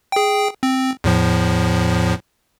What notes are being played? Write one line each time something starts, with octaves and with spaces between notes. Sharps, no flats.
G#4 G5
C4
E2 A2 F3